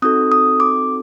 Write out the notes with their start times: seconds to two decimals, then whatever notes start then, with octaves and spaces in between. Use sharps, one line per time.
0.02 C4 D#4 F#4 A4 D#6
0.32 D#6
0.60 D6